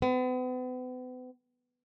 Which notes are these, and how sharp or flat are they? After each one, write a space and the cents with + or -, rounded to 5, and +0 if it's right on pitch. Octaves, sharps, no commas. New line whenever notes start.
B3 +40